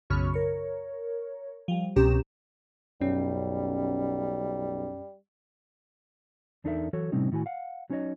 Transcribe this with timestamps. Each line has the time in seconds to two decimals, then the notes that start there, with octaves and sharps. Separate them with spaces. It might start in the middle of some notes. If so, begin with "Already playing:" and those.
0.10 B1 F#2 C#3 B5 C#6 F6
0.33 A#4 C#5
1.68 F3 G3
1.96 C2 B2 C#4 G4 A#5 E7
3.01 B1 F#2 G3 C#4
6.64 E2 D4 D#4 A4 A#4 E5
6.93 E3 F#3 F#4 A4 C#5
7.12 A2 C3 G3 C4 C#4 D#4
7.32 A2 D#3 E4 F#4 G#5
7.46 F5 F#5
7.90 F#3 C#4 D#4 C5 C#5 D#5